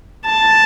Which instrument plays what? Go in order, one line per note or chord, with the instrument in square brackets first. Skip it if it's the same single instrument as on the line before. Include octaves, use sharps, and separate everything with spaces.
[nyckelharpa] A5